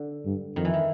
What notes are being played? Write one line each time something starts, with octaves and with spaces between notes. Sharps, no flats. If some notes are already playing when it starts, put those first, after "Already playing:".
Already playing: D3
G2
F2 D#3
E3
D#3